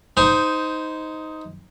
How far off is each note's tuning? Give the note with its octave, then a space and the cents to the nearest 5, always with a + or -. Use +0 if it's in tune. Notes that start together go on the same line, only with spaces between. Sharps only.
D#4 +10 C5 -15 G#5 +0